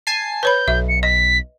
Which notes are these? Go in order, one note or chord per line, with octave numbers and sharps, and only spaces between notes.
G#5 A5 C7
B4 C#5 B5 G6
B1 E5
C#7
D#5 B6